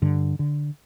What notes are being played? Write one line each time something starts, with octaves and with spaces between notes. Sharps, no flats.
G2 D3
D3